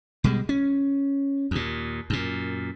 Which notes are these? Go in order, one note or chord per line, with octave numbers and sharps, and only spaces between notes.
B2 G3 G#3
C#4
D#2 A#2
F#2 A#2